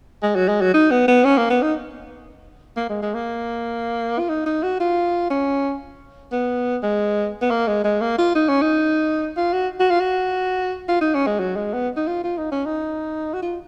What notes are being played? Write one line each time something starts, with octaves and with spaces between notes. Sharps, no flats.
G#3
F#3
G#3
F#3
D#4
B3
B3
C#4
A#3
B3
D#4
A#3
G#3
G#3
A#3
F4
D#4
D#4
F#4
F4
C#4
B3
G#3
B3
A#3
G#3
G#3
A#3
F4
D#4
C#4
D#4
F4
F#4
F#4
F4
F#4
F4
D#4
C#4
G#3
F#3
G#3
B3
D#4
F4
F4
D#4
C#4
D#4
F#4
F4